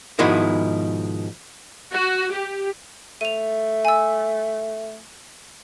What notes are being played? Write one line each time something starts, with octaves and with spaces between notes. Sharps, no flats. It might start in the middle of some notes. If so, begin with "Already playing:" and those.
G#2 B2 D#3 F3 G#3 E4
F#4
G4
A3 D#7 F7
G#5 E6